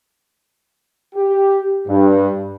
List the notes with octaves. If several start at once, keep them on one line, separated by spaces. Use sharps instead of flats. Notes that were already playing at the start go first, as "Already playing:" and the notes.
G4
G2